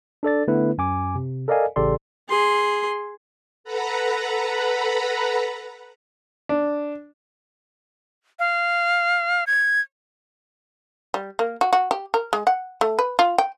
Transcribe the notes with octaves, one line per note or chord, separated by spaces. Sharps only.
D4 A4 D5 A6
D3 A3 B3 E4 B4
F#2 G#5 D6
C3
A4 A#4 D5 D#5 F5 G#5
A1 C#3 G4 A4 D5 C6
G#4 C6
A4 B4 F#5 A#5 B5
D4
F5
G#6
G3
A#3
F#4
F#4
G4
A#4
G#3
F#5
A3
B4
F4
G5